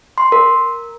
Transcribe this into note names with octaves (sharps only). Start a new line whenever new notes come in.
C6
A#4